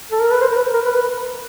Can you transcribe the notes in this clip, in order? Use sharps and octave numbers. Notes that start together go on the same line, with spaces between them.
A4
A#4
B4
C5
A#4
B4
A#4
B4
B4